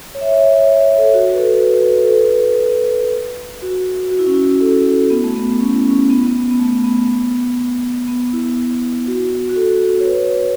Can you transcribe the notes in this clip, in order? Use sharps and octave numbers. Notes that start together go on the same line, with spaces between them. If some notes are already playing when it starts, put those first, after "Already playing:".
C#5
E5
C#5
C#5
C#5
C#5
C#5
A4
F#4
B4
A4
B4
A4
B4
F#4
F#4
E4
C#4
E4
A4
A4
B3
A3
B3
C#4
E4
C#4
B3
B3
B3
A3
B3
B3
E4
F#4
F#4
A4
C#5
B4